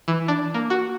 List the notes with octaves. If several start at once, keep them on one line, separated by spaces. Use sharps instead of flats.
E3
D4
A#3
F#4